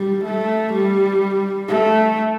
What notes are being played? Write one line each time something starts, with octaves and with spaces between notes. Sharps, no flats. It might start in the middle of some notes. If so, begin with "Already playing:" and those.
Already playing: G3
A3
G3
A3